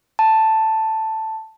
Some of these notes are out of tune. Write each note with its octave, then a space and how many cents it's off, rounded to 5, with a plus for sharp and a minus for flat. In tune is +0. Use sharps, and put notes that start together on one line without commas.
A5 +5